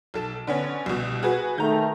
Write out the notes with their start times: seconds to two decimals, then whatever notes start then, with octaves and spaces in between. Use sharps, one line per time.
0.14 B1 A4 E7
0.47 D3 B3 C#4
0.86 C2 B2
1.23 F#4 G#4 B4
1.58 D#3 A3 A#5 G6